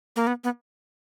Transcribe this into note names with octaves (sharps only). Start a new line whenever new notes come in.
A#3
B3
B3